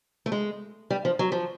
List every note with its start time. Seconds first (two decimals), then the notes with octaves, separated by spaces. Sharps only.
0.26 A3
0.32 G#3
0.90 G3
1.05 F3
1.19 F#3
1.32 F3